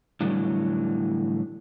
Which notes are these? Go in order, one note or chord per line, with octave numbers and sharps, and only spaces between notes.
A2 D3 E3 F#3 G3